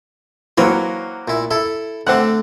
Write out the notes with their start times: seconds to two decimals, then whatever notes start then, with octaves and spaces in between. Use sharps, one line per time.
0.57 E3 F#3 A#3 C5 C#5 G5
1.28 A#2 E4
1.51 E4 A4
2.07 D3 A3 C4 D4 F#5